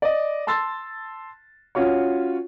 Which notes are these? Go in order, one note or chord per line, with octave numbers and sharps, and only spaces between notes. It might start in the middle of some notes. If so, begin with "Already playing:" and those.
D5 D#5
A5 C6 E6 A6
C#4 F4 F#4 C#5